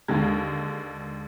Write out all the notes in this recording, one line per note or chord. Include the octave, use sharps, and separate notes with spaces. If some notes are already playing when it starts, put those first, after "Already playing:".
D#2 D3 G#3